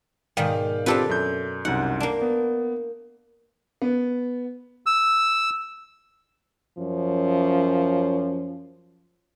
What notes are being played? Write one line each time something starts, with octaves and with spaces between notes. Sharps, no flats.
G#2 B2 D#3 D5 F5 G5
C4 D4 F4 G4 A4 B4
F#2 G6
C2 F#2 D#4 F#5
A#3 D4
B3
B3
E6
F#2 F3 C#4